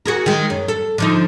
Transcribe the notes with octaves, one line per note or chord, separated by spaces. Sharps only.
F#4 G#4 A#4
D#3 G#3
F#2
A4
D3 F3 D#4